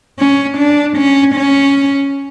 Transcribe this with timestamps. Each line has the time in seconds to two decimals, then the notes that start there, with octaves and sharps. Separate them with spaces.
0.19 C#4
0.58 D4
0.97 C#4
1.35 C#4